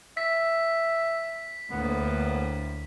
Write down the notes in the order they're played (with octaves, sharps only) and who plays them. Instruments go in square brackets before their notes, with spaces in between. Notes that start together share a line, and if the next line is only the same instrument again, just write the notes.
[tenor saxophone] E5 [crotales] B6
[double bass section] D2 [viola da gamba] A2 A#3 [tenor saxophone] B3